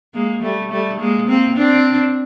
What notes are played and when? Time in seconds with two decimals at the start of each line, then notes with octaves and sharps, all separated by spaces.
0.14 G#3 A#3
0.42 G3 A3
0.71 G3 A3
0.99 G#3 A#3
1.27 A#3 C4
1.56 C4 D4